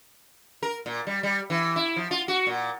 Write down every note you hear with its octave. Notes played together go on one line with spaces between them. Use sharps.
A#4
A#2
G3
G3
E3
E4
F3
F4
F#4
A#2